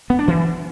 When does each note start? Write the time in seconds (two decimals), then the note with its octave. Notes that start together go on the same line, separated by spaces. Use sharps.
0.10 B3
0.19 D4
0.28 E3